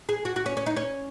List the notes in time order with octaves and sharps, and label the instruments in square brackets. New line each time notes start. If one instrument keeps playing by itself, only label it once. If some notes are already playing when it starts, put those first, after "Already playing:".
[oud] G#4
F#4
F#4
C#4
C#4
D#4
C#4